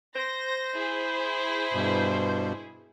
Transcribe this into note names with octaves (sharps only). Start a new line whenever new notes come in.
C5 A#6
E4 G#4
G2 B2